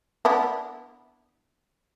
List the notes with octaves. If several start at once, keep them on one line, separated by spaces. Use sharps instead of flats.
B3 D4 E4